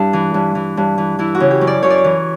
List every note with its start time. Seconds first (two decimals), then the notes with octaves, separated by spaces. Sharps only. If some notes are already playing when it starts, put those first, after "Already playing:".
Already playing: G2 D4 E4
0.13 E3
0.34 G2
0.55 E3
0.77 G2
0.98 E3
1.19 E3 E4
1.35 F#4
1.40 C#3
1.51 G4
1.61 F#2
1.67 D5
1.83 F#2 C#5
1.90 D5
1.98 C#5
2.04 E3